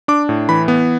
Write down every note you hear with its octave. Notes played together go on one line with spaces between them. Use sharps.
D4 D6
A2
E3 B5
B3